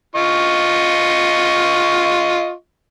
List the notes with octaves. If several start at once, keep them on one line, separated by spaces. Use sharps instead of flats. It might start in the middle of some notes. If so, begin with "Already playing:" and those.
F4 D#5 C#6